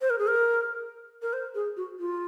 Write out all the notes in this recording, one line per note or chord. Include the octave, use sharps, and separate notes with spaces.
C5
A#4
G#4
A#4
A#4
C5
G#4
F#4
F4